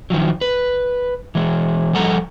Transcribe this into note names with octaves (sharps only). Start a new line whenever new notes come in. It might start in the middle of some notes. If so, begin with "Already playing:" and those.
D#3 F3 F#3
B4
E3 G#3
F3 G3 A4 F#5 A#5